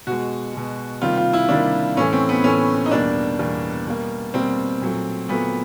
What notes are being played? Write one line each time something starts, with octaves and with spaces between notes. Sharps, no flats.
B2 G#3 F#4
B2 G#3
C3 D#3 G3 A#3 F4
F4
E4
C3 D#3 G3 A#3 D4
A2 E3 A3 C#4
C4
B3
A2 E3 A3 C#4
D#4
E2 B2 G3 A#3 D4
E2 B2 G3 A#3
B2 G3 A#3
B2 G3 A#3 C4
A#2 F#3 A3
A#2 F#3 A3 B3